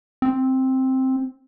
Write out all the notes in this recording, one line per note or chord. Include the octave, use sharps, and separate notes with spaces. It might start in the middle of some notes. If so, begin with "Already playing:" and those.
C4